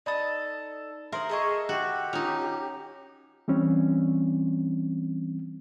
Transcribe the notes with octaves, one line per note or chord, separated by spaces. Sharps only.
D#4 A4 D5 B5 D#6 A6
G#4 A#4 C5 E5 C6
G#4 A4 D#5 C#6
F#4 G4
C#4 D#4 F4 F7
E3 G3 C4 C#4